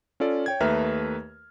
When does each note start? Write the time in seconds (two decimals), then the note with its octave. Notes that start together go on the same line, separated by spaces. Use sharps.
0.20 C#4 F4 A4 D5
0.46 C#5 G5 G#6
0.60 D#2 A3 B4 E5 A#5 F6